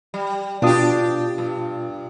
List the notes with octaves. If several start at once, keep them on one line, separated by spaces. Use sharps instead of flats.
G3
B2 D4 F4 G4 D#6
G2